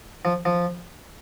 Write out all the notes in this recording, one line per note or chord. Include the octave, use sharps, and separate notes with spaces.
F3
F3